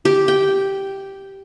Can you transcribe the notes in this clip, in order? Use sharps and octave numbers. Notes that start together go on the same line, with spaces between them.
G4
G5